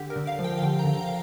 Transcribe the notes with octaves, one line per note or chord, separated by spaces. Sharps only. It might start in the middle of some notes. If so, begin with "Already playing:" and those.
Already playing: D3 G4
A#4
D3
F5
F3
G5
F5
D3 G5
A#5
D3
A#5
F5